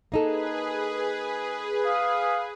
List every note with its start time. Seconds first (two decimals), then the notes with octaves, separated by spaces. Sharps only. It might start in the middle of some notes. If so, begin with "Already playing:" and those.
0.12 A#3 D#4 G#4 A4 B4
1.84 F5 D#6